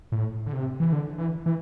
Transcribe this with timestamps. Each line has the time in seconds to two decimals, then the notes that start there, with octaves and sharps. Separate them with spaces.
0.12 A2
0.47 D3
0.53 C3
0.80 E3
0.93 D3
1.18 E3
1.46 E3